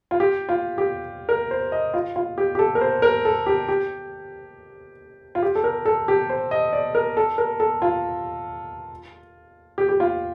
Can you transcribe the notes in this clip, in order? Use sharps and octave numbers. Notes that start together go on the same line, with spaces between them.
F4
G4
F4
G4
A#4
C5
D#5
F4
F4
G4
G4
A4
A#4
C5
A#4
A4
G4
G4
F4
G4
A4
A#4
A4
G4
C5
D#5
D5
A#4
A4
A#4
A4
F4
G4
G4
F4